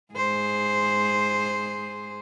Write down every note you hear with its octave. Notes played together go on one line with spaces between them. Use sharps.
G#2 G#4 C5